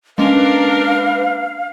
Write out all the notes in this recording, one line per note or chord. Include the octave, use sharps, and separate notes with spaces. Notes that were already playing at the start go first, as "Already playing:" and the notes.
G#3 A#3 C#4 D4 A#4 B4 F5